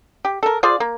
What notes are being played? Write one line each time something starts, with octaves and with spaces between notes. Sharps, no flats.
G4
A4 A#4
F4 G#4 C5 D5
A#3